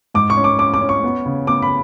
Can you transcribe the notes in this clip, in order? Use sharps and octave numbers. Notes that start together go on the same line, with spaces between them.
G#2 D6
C#6
C#4
D6
C#4 D6
D6
C#4
C#6
B3
C#3
B3 D6
B5